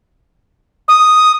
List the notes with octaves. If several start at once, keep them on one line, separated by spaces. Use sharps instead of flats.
D#6